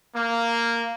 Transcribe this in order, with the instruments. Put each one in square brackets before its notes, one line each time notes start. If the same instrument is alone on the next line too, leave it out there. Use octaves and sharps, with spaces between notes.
[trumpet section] A#3